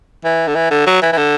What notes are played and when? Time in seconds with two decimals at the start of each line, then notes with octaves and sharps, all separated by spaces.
0.24 E3
0.47 D3
0.55 E3
0.71 D3
0.86 F#3
1.02 E3
1.12 E3
1.18 D3